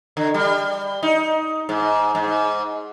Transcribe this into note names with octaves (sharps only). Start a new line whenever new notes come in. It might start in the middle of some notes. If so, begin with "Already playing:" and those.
D3
G3
D#4
G#2
G#2